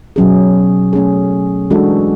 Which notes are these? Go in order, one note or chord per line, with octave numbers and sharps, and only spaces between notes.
B2 F#3 C#4 G#4
A3 C#4 G#4
E3 G#3 D4 F#4 A4